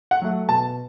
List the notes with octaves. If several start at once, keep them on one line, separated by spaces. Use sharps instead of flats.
F#5
F#3 A3
B2 A5